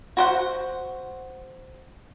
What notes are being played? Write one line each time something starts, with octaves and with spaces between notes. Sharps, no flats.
F#4 C5 F#5